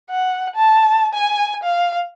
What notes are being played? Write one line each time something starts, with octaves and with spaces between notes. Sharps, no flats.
F#5
A5
G#5
F5